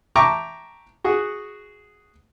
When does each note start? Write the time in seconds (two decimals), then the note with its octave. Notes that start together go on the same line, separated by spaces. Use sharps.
0.16 E5 G5 A5 A#5 C#6 D6
1.04 F#4 G#4 F#5